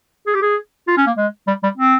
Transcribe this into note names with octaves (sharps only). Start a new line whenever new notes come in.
G#4
G4
G#4
F4
C#4
A#3
G#3
G3
G3
C4